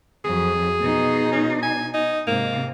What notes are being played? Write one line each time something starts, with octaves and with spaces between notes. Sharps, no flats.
F2 F#3 G#4
B2 D#4
C#4
G#5
D#4
G#2 C3 A#3